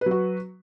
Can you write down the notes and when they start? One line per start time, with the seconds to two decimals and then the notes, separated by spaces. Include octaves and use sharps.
0.01 B4
0.06 F#3
0.11 F#4